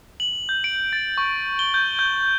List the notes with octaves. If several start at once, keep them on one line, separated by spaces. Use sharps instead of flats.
F#7
G6
D7
A6
C#6
G7
G6
G6